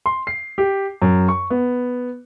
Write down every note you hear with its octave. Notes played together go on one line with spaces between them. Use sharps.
C6
C7
G4
F#2
C#6
B3